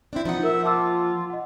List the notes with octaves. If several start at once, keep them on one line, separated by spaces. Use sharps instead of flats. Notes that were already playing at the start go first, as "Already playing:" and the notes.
C4 D4 E4
F3 A#3 D#4 F#5
A#4 E5
F4 A5 D6 E6
D#5 F#5